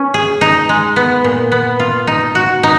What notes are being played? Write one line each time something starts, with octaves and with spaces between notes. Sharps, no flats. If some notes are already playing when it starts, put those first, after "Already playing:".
Already playing: C#4
G#4
D#4
G#3
B3
A#2
B3
F4
D#4
F#4
D#4